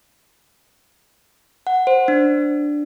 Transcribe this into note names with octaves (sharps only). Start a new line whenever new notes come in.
F#5
C5
D4